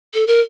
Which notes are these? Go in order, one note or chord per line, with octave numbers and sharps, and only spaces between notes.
A4
A#4